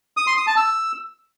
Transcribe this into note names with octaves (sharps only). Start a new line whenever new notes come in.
D#6
C6
D#6
A5
E6